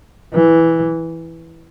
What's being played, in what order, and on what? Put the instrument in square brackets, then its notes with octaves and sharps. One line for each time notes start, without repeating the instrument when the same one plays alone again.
[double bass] E3